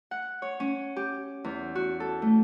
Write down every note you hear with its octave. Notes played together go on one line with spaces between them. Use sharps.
F#5
C#5
C#4
G4
E2
F#4
A4
A3